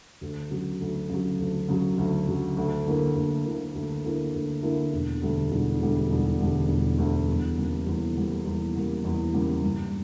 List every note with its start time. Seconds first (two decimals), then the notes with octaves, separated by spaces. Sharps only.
0.21 D2
0.50 C#3 F#3
0.80 D2
1.10 C#3 F#3
1.39 D2
1.68 C#3 F#3
1.98 D2
2.27 C#3 F#3
2.57 D2
2.86 D3 A#3 E4 A#4
3.16 D2
3.45 D3 A#3 E4 A#4
3.75 D2
4.04 D3 A#3 E4 A#4
4.34 D2
4.63 D3 A#3 E4 A#4
4.92 E1
5.22 D2 D3 G3
5.52 E1
5.81 D2 D3 G3
6.10 E1
6.39 D2 D3 G3
6.69 E1
6.98 D2 D3 G3
7.28 E2
7.57 C#3 G3 A#3
7.87 E2
8.16 C#3 G3 A#3
8.45 E2
8.75 C#3 G3 A#3
9.05 E2
9.34 C#3 G3 A#3
9.63 G2